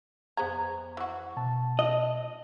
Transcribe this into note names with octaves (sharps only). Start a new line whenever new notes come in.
F2 B3 G#4 C5 A#5 G#6
E3 F#4
B2 A5
D#5